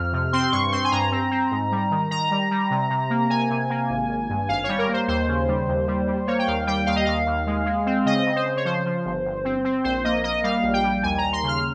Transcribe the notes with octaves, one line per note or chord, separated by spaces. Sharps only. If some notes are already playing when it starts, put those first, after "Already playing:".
Already playing: F2 F6
C3
C4 C6
G2 C#6
C4 C6
G#5
G2 A#5
C4
C4
G#2
G3
D#3
D#3 A#5
G3
G3
C3
C3
A#3
C3 G#5
C3
A#3
G#1
G#1
G2
G#1 F5
G3 C#5
A#4
A#3
C5
D#2 C5
C#3
G3
D#2
G3
G3
A#3 C#5
G5
D#2 F5
G3 G5
D#2 F5
D#5
D#2 F5
D#2
G#3
G#3
C4
C#3 D#5
C#3
C5
C#3
C#5
F3 C5
F3
G1
G1
C4
C4
A#1 C5
A#3 D#5
A#3 D#5
G3 F5
A#1
G5
G3
D#2 G#5
A#5
D#2
C6
C#3 F6